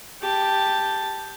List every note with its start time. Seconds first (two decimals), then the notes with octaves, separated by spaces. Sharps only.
0.22 G4 A5